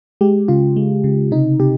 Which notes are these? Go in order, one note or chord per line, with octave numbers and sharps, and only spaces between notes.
G#3 G4
C#3 F4
G#3
C#3
C3 D#4
C3 G4